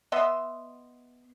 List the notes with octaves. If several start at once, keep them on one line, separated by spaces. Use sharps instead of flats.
B3 D#5 E5 C6